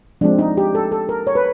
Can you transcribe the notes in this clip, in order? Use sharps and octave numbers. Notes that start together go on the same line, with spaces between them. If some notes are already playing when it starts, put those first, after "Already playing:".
F3 G#3 C4 D4
D#4
G4
A4
A4
A#4
C#5
B4